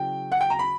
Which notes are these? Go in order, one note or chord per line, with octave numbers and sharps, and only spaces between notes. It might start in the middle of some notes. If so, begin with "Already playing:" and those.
Already playing: C#3 F#3 E4 G5
F#5
G5
A#5
B5